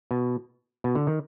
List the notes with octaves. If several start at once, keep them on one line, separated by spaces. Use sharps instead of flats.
B2
B2
D3
D#3